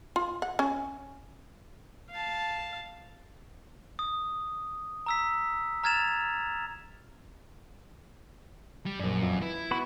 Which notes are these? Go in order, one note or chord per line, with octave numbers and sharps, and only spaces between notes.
F4
F#5
C#4
F5 A5
D#6
A#5 E6 B6
A#5 F6 G#6 A6 E7 F7
G3
A#1 F#2 D5
F2
E4 B4
B3 F#4 B5